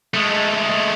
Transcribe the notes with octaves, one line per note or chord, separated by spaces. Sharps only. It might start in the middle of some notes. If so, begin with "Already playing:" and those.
G#3 A3